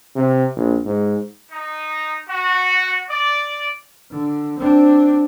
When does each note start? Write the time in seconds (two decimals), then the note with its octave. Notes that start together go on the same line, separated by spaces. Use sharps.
0.16 C3
0.56 A#1
0.85 G#2
1.52 D#4
2.29 F#4
3.09 D5
4.10 D3
4.58 C4 D4